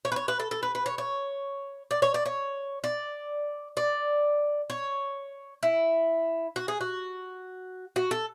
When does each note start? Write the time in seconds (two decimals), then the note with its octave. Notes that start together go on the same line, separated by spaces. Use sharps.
0.05 C#5
0.12 B4
0.16 C#5
0.28 B4
0.40 A4
0.51 A4
0.63 B4
0.75 B4
0.86 C#5
0.98 C#5
1.91 D5
2.02 C#5
2.14 D5
2.26 C#5
2.84 D5
3.77 D5
4.70 C#5
5.63 E4
6.56 F#4
6.68 G#4
6.81 F#4
7.96 F#4
8.11 A4